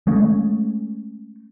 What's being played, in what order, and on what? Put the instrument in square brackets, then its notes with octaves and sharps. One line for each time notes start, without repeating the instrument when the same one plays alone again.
[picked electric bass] G#3 A3 C#4